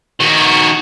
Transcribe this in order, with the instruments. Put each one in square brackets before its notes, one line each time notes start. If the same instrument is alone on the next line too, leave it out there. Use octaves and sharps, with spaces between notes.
[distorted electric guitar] D#3 F#4